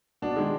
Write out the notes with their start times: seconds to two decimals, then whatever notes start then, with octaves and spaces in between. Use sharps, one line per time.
0.22 B2 D4
0.36 D#3 G#3